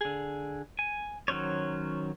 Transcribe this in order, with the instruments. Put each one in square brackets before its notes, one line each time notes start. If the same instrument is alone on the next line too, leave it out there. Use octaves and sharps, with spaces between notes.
[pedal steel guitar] D3 G#4
G#5
D#3 F#3 C#4 C5 C#5